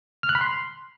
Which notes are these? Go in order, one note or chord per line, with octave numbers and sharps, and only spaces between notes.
F6
F#6
B5
C6